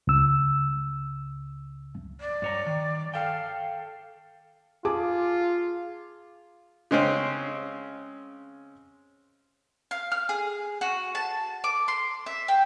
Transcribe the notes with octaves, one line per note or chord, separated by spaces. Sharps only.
C#2 E6
D5
G2 C#5 A#5
D#3
A4 F5 G5
F4 G#4 A5 D6
C#3 G#3 C4 C#4
F5
F6
G#4
F#4
A5
D6
C6
E5
G5